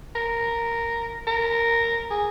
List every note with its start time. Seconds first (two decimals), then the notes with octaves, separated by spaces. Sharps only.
0.16 A#4
1.27 A#4
2.11 G#4